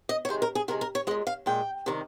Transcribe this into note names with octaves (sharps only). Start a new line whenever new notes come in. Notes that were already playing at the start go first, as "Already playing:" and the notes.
D#5
C#5
C3 D#3 G#3 C5
A#4
G#4
C3 D#3 G#3 A#4
A#4
C#5
A#2 G#3 D#5
F5
A#2 G#3 G5
C3 D#3 G3